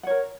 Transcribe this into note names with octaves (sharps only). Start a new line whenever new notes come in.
A#4 C#5 F#5